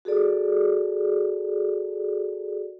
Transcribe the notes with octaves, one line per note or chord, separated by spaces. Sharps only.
F#4 G#4 A4 D5